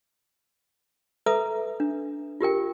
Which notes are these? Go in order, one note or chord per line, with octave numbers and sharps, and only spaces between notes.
A4 B4 E5 A#5 D#6
D4
F4 G4 A#4 G5